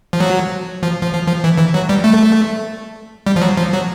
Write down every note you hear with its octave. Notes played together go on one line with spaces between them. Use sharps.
F3
F#3
F3
F3
F3
F3
E3
E3
F#3
G3
A3
G3
F3
F#3
F3
F#3